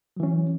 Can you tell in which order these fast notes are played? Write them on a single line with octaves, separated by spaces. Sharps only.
F#3 E3 C#4